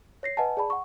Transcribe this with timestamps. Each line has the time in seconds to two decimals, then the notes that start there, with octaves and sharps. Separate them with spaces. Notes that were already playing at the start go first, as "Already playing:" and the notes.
0.23 C#5 A#6 C7
0.37 B4 D#5 F#5 G#5 A5
0.57 G#4 D5 A5 B5
0.70 F#5 C#6